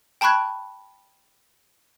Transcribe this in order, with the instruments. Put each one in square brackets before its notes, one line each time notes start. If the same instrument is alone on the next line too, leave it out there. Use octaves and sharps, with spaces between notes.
[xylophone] G5 A5 B5 C#6 F#6 G#6